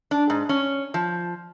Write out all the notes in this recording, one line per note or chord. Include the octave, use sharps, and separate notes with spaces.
D4
G#2
C#4
F3